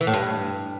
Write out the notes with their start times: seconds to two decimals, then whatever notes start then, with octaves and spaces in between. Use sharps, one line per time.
0.01 E3
0.07 A2
0.14 G2